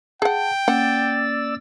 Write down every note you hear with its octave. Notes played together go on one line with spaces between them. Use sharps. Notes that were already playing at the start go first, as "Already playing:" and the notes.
G#4 F#5 G5 A5
A#3 C#4 D5 F#5 E6 A6